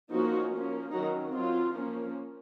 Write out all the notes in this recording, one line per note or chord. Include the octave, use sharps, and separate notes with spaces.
F3 A#3 C#4 D#4 F#4
F3 A#3 C#4
D#3 F#3 C#4 D#4 F#4
F#3 C4 F4
F3 A#3 C#4